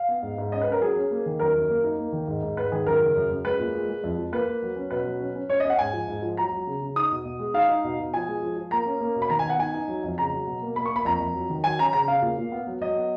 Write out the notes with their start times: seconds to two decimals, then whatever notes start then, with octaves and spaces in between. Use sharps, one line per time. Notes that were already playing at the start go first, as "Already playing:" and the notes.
Already playing: F5
0.09 B3
0.22 G#2
0.38 G#2
0.52 C#4 D#5
0.61 B4
0.67 C#4 A#4
0.81 F#3 G#4
0.96 C#4
1.11 A#3
1.26 D#3
1.39 F#2 A#4
1.54 F#2
1.70 A#3
1.84 D#4
1.99 A#3
2.13 D#3
2.28 G#2
2.42 G#2
2.57 G#2 B4
2.72 D#3 G#4
2.86 F#2 A#4
3.01 C#3
3.15 F#2
3.30 F#2
3.44 G#3 B4
3.60 A#2
3.75 G#3
3.88 G#3
4.04 F2
4.18 F3
4.32 A#3 B4
4.48 A#3
4.62 F#3
4.76 C#4
4.91 B2 B4
5.05 F#3
5.20 C#4
5.36 C#4
5.49 C#4 C#5
5.60 D#5
5.64 C#4
5.70 F#5
5.79 G#2 G#5
5.93 F3
6.08 G#2
6.22 F3
6.37 F#3 A#5
6.52 F#3
6.67 C#3
6.81 C#3
6.96 D#4 D#6
7.11 B2
7.25 B2
7.39 G#3
7.54 D#4 F5
7.69 D#4
7.84 B2
7.99 B2
8.13 F3 G#5
8.28 G#3
8.42 F3
8.56 F3
8.71 A#3 A#5
8.86 C#4
9.00 A#3
9.16 B2
9.22 B5
9.30 D#3 A#5
9.39 G#5
9.45 B3 F#5
9.59 D#4 G#5
9.74 D#4
9.88 F#3
10.03 F2
10.18 C#3 A#5
10.32 F#3
10.47 B2
10.62 A#3
10.76 A#3 B5
10.86 C#6
10.91 A#3
10.96 B5
11.05 F2 A#5
11.20 F2
11.34 F#3
11.50 D#3
11.64 F#3 G#5
11.78 C#4 A#5
11.93 C#3 A#5
12.08 C#3 F5
12.22 A#2
12.38 A#2
12.52 B3
12.67 F#3
12.81 F#3 D#5
12.96 B3